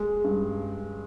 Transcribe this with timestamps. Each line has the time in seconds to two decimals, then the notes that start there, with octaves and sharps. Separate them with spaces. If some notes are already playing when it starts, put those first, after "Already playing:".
Already playing: G#3
0.24 G2